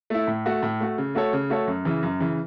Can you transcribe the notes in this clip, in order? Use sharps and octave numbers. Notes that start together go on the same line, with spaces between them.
A3 E4
A2
A3 F#4
A2
A3 F#4
C#3
A3 F#4 A4 C#5
C#3
A3 F#4 A4 C#5
F#2
C#3 E3
F#2
C#3 E3